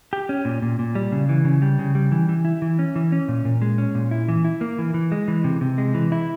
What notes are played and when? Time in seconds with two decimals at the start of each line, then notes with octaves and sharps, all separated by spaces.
0.13 G4
0.29 C#4
0.45 A#2
0.62 A#2
0.79 A#2
0.95 G3
1.12 C#3
1.29 E3
1.45 C#3
1.62 G3
1.79 C#3
1.95 G3
2.12 E3
2.29 E3
2.45 E4
2.62 E3
2.79 C#4
2.96 E3
3.12 C#4
3.28 A#2
3.45 A#2
3.62 G#3
3.78 C#4
3.95 A#2
4.11 E4
4.28 E3
4.45 E4
4.61 A#3
4.79 E3
4.94 E3
5.12 G#3
5.28 E3
5.44 C3
5.61 C3
5.78 G#3
5.94 E3
6.12 E4